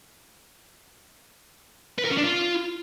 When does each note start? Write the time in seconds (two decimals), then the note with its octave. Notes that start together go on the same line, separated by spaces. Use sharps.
1.98 B4
2.05 A#4
2.11 C#4
2.17 D4
2.24 F4